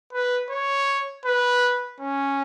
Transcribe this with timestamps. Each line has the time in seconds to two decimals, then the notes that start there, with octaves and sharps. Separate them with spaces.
0.13 B4
0.50 C#5
1.25 B4
2.00 C#4